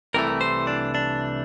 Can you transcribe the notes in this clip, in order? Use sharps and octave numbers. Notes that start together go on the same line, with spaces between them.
C2 C3 E3 A3 A#4
C5
D4
D4